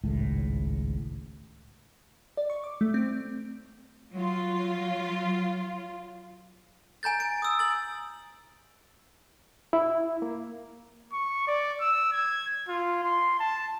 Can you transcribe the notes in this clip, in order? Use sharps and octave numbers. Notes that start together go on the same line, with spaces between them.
G#1 C#2 A2
D5
C#6
D6
A3
C4
F#3 F4
G#5 A#5 G6 A6
D7
D#6 E6
A6 F#7
E4
A#3
C#6
D5
E6
G#6
F4
C6
A5